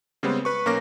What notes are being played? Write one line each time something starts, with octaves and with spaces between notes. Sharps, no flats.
C#3 G3 G#3 B3 C4
B4 C#6
B1 A#3 C#4 A#4 D6 A#6